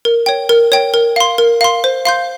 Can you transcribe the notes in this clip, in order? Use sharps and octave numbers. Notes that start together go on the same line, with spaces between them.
A#4
C#5 G5
A#4
C#5 G5
A#4
F5 C6
A#4
F5 C6
C5
F5 C6 G6